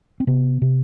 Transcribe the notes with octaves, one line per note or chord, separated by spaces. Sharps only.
C4
C3 B3
C3